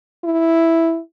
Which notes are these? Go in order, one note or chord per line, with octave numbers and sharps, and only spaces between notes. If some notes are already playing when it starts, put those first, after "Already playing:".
E4